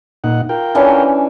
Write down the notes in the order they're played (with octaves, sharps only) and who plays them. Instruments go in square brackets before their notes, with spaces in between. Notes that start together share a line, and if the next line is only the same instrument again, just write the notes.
[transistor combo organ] A#2 D#4 F#5
F4 A#4 G5
[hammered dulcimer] E3 C#4 D4